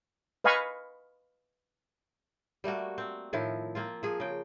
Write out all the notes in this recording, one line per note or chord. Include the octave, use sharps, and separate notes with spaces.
B4 D#5 F5 G#5 B5 C#6
G3 A3 A#3 F#4
C4
A2 D#3 F3 E4
A#3 C4 F4
F3 G#4
C#3 G5